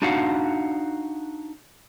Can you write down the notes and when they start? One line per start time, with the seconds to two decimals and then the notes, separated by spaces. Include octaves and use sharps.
0.02 D4 D#4 F#4 F5 F#5